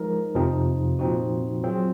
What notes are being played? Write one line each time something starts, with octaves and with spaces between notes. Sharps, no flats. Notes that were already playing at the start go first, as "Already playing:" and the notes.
Already playing: F3 G#3 D#4 A#4
F2 C3 F3 C4 D#4
A#2 F3 C4 D#4 F#4
F#3 C4 F4 G#4